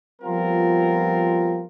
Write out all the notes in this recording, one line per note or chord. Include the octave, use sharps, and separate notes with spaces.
F3 G3 B3 C4 F4 A#4